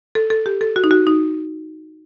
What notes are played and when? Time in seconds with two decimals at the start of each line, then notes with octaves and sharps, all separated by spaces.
0.15 A4
0.30 A4
0.46 G4
0.61 A4
0.76 F#4
0.84 D#4
0.91 F#4
1.07 D#4